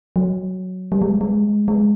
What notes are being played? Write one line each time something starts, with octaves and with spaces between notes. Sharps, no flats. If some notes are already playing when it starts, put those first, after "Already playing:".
F#3
G3
G#3
G#3
G#3